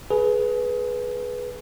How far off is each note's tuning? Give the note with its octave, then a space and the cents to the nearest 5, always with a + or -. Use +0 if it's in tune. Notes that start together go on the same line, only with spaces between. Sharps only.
G#4 +25 B4 -5